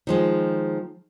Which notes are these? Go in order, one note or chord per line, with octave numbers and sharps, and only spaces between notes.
D#3 F3 G#3